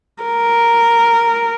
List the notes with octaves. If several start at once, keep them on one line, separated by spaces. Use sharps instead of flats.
A#4